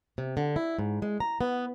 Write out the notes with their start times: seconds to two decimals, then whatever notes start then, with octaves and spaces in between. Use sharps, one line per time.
0.18 C3
0.37 D3
0.56 E4
0.78 G#2
1.02 G#3
1.20 A#5
1.41 B3